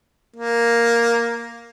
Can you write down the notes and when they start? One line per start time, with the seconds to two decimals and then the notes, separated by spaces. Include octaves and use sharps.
0.36 A#3